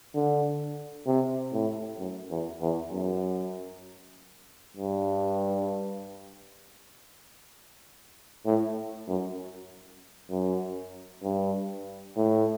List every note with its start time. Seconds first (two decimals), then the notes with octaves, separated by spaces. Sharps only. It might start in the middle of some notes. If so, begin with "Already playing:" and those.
0.15 D3
1.06 C3
1.53 A2
1.99 F#2
2.31 E2
2.61 E2
2.91 F#2
4.77 G2
8.46 A2
9.08 F#2
10.30 F#2
11.24 G2
12.16 A2